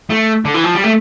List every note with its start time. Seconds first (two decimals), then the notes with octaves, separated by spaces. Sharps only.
0.10 A3
0.45 D3
0.54 E3
0.64 F3
0.74 G3
0.84 A3